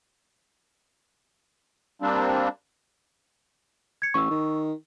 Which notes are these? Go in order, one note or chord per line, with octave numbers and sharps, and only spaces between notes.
G3 A#3 C4 D4
G#6 C#7
A1 C#6 E6
D#3